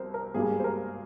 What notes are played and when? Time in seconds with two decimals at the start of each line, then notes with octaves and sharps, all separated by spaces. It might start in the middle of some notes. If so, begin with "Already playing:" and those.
Already playing: C2 A#4 C5
0.14 A#4
0.34 G#1 G2 G3 A#3 G#4
0.59 C5
0.64 A#4